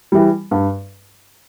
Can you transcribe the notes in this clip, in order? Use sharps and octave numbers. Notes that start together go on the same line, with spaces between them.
E3 G3
G2